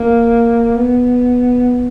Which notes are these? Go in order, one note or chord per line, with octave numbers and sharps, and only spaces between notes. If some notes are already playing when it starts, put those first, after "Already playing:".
Already playing: A#3
B3